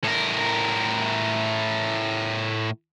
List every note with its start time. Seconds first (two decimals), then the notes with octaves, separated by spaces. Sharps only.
0.04 A2 A#4